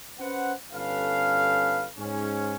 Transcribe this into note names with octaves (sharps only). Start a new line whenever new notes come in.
C#4 B4 C5 F#5
G1 C#4 A4 B4 F5
G#2 C#4